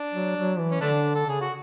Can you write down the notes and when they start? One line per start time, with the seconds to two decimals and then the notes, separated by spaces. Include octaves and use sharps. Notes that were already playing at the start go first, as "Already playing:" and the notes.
Already playing: D4
0.14 F#3
0.37 F#3
0.59 E3
0.71 C#4
0.81 D3 A3 D4
1.16 A4
1.26 C#3 G#4
1.41 F#4